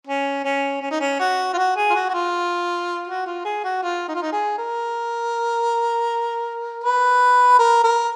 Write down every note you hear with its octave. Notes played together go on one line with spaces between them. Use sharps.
C#4
C#4
C#4
D#4
C#4
F#4
F4
F#4
G#4
F4
F#4
F#4
F4
F#4
F4
G#4
F#4
F4
D#4
F4
D#4
G#4
A#4
B4
A#4
A#4